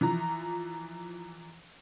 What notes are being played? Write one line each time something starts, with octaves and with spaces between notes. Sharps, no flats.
E3 F3 A#5